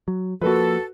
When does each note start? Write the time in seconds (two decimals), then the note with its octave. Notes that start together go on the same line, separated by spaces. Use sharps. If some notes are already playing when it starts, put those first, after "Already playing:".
0.08 F#3
0.41 F3 G#3 A#3 F#4 A4 B4